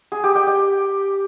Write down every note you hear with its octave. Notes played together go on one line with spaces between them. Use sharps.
G#4
G4
G5
G5